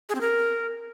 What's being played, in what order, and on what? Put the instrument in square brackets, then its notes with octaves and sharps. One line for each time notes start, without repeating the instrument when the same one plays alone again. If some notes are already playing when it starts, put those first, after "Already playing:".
[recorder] G#4
C4
A#4